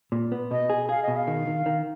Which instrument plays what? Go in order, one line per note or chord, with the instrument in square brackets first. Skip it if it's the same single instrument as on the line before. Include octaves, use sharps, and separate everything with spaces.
[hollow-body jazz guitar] A#2
B3
[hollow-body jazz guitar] B2 [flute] D#5
[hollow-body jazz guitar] G#4
[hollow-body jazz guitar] G#4 [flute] F5
[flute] D#5
[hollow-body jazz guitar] B2
[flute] F5
[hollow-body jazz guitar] D#3
D#3
D#3